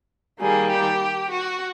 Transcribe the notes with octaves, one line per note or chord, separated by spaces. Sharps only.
D#3 G3 A#3 G#4
G4
F#4